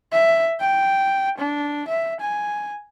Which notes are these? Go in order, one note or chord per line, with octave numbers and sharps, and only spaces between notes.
E5
G5
D4
E5
G#5